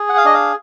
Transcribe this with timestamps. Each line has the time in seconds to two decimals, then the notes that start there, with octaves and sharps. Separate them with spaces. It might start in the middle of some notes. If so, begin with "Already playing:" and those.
Already playing: G#4
0.09 F#5
0.17 F5
0.25 D4 D#5
0.34 F5